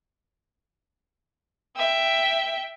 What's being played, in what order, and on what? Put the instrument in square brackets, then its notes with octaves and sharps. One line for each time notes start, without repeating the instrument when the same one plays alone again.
[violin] E5 G5